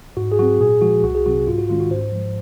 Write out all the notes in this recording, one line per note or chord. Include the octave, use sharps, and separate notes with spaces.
G#2 F#4
G#4
F#3 C4 F#4
A#2 G#4
F3 G#3 F#4
C2 F#4
G#4
C3 F#3 C4 F#4
G#2 F4
F#4
D#3 G#3 C#4 F4
F#4
G#2 C5
F3 G#3